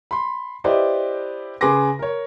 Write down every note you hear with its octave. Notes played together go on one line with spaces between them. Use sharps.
B5 C6
E4 G4 B4 C5 D5 D#5
C#3 G#4 B4 C6 D6 A#6
A#4 C#5